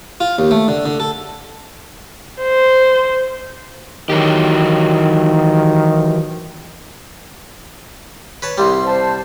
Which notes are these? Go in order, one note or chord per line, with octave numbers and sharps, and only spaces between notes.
F4
D#2
A3
D3
D3
A4
C5
D#3 E3 F#3 G4
B4 C#5 A5
C2 G3 C6
C5 A5